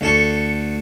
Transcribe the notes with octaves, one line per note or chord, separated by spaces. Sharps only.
D2 A4 C#6